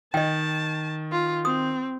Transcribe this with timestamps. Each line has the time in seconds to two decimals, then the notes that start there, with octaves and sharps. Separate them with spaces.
0.14 D#3 D#5 G5 A5
1.12 F4
1.45 C4 D#6